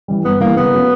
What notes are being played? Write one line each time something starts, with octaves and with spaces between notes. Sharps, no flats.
E3 G3
G2 B3
E3 G3 A#3
C#3 B3
F#3 A3 C#4